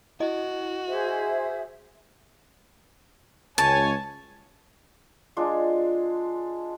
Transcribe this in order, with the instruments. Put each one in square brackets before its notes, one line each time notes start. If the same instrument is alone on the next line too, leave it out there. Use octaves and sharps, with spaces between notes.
[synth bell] E4 D#5 [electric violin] F#4
[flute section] G#4 C5 E5
[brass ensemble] C#2 C#5 G#5 [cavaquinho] A5
[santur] G#3 D4 F4